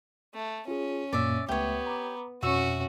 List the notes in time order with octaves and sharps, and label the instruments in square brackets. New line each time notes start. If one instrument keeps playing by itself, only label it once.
[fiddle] A3
[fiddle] C#4 [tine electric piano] F4 G#4
[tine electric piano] F#2 A#2 A#3 [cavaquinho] D5 E5
[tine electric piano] C#2 A3 E5 [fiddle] B3 [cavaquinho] G4 C#5
[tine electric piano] A#5 B5 D6
[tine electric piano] F2 B2 [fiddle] C#4 F#4 [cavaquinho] E5 C#6